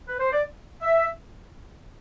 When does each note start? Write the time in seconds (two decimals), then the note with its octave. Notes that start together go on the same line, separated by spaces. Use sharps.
0.08 B4
0.20 C5
0.32 D5
0.81 E5